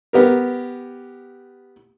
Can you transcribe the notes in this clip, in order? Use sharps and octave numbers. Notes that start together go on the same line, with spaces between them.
B3 G4 A#4